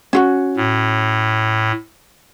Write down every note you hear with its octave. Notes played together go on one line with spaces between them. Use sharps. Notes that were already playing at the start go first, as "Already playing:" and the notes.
C#4 F4 F#4
A2